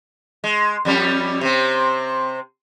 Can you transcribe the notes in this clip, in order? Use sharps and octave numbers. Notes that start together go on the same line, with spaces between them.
G#3
F2 G3 C#4
C3 C4